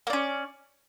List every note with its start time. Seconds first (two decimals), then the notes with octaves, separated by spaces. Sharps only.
0.07 A#3
0.10 D5
0.13 C#4